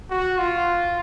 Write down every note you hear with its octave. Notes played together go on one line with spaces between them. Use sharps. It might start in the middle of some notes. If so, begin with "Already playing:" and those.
F#4
F4